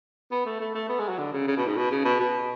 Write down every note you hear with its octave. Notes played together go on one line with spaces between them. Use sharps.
B3
A3
A3
A3
B3
G#3
F#3
D3
C#3
C#3
B2
G#2
B2
C#3
B2
B2